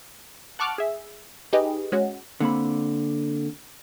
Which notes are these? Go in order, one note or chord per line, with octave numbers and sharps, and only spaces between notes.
F#5 A5 C#6 D6 F6 F#6
G#4 E5
D#4 G4 G#4 B4 D#5
G#3 C#4 F#4
D3 A#3 C4 B5